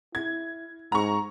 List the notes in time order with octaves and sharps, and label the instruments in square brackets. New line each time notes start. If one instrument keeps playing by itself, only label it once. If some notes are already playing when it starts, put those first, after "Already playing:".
[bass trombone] E4 [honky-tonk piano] G#6
[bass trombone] G#2 [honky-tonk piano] A#5 C#6